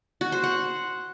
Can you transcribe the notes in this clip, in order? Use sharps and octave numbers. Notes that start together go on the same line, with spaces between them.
F#4
C5
F#5